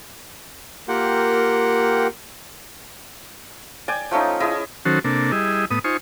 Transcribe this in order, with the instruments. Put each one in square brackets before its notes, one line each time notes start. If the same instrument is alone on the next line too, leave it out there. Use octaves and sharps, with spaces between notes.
[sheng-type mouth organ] A#3 F4 G4 A#4 F#5 G5
[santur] D5 G5 G#5
F3 A3 C#4 D#4
E4 G#4 D#5 D#6
[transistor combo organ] D#3 F#3 C#4 F#4 A4 C5
C3 A#3 D4 A4
G3 E4 G#4 D#5
A2 B3 D#6
D#4 F4 C5 G#5 C#6